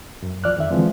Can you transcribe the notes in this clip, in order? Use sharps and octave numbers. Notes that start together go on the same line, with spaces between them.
F#2
C2 F3 D5 F6 F#6
F2 D#3 E5
D3 E3 F3 G#3 C4